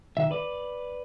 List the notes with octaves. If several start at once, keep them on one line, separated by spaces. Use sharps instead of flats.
D#3 E5
B4 D5